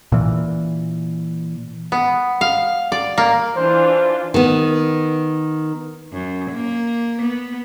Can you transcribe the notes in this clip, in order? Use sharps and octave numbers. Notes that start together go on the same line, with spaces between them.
A#2 E3
B3
F5
D5
A#3
E3 D4 F4 C5
D#3 B3
F#2
A#3
B3